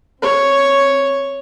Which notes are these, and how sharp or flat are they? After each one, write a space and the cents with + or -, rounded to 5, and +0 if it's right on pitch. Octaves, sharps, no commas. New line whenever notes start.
C4 +15 C#5 +0